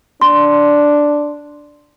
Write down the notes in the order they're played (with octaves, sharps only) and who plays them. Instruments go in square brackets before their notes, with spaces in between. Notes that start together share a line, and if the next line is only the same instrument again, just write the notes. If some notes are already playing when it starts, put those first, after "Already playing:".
[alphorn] D4 [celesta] C6